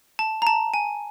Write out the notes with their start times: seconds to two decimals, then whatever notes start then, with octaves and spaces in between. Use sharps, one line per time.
0.19 A5
0.42 A#5
0.47 A5
0.74 G#5